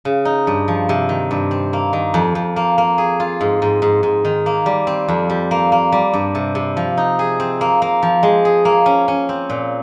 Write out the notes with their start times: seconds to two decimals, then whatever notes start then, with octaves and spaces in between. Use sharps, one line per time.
0.05 C#3
0.25 D#4
0.47 G2
0.68 F3
0.89 C3
1.09 D#3
1.31 G2
1.51 C4
1.73 A#3
1.93 D#3
2.14 F2
2.35 F2
2.56 A#3
2.78 A#3
2.98 G#4
3.20 F4
3.41 G#2
3.62 G#2
3.82 G#2
4.03 G#2
4.25 D#3
4.46 A#3
4.66 G3
4.87 C4
5.08 F2
5.30 G3
5.51 A#3
5.72 A#3
5.92 G3
6.13 G2
6.35 C3
6.55 C3
6.77 F3
6.97 D#4
7.19 G#4
7.40 C4
7.61 A#3
7.82 A#3
8.03 F3
8.23 G#3
8.45 G#4
8.65 A#3
8.86 C#4
9.08 C#4
9.29 C4
9.50 A#2